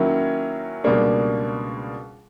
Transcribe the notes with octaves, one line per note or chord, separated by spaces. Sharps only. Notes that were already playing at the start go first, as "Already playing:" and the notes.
Already playing: D#3 F#3 A#3 C#4 E4
C#2 B2 G3 A#3 D4